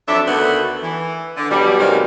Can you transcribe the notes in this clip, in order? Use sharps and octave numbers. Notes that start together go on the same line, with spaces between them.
F2 F#3 D4 A4 E5
D2 D#3 A3 B3 F#4 B4
E3
D3
E2 B2 F#3 G3
B2 D#3 F#3 G#3 A#3 C4